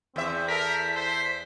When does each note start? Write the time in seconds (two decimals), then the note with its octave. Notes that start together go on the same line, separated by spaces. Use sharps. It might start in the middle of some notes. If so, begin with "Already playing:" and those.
0.16 E2 C4 E5
0.49 A4 A#4 B6
0.96 C5